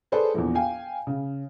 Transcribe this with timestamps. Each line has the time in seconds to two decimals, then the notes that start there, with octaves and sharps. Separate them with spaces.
0.12 G#4 A4 B4 C5 D5
0.34 A#1 E2
0.55 F5 G5 G#5
1.07 C#3